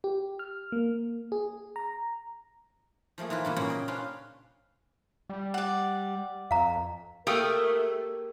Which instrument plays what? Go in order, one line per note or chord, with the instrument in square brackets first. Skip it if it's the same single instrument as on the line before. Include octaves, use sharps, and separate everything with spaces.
[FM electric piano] G4
F6
A#3
G#4
A#5
[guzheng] F3 A3 A#3 G#4
E3 D#4 F4 B4
G2 A#2 B3
A#2 C#3 C#4 F#4 C#5 F#5
A#4 D#5 G5
C#4 D4 F4 B4 C5
[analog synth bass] G3
[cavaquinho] D5 F#5
[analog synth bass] F2 [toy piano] F5 A#5
[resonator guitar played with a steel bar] A3 [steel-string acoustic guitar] A#3 G4 G#4 [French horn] A#4 [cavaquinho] F5 G5 D#6